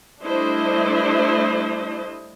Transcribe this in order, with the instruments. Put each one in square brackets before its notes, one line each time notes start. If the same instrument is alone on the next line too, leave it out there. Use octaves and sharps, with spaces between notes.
[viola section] G3 A3 D4 E4 C5 D#5